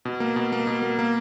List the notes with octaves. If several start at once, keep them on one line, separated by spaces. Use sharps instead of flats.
B2
A#3
B2
A#3
B2
A#3
A#3